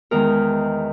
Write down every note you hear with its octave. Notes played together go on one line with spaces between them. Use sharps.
E2 D#3 G#3 A#4